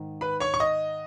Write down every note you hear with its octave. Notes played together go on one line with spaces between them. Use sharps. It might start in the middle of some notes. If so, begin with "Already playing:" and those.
Already playing: G#2 D#3
B4 B5
C#5 C#6
C#6
D#5 D#6